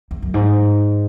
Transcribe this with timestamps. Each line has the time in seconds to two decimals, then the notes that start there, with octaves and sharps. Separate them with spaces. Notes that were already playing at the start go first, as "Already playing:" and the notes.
0.11 E2
0.22 F#2
0.34 G#2